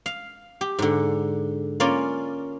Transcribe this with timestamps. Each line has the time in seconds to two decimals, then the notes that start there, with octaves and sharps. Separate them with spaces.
0.06 F5
0.61 G4
0.79 G#2 D3
1.80 A#3 C#4 F4 D5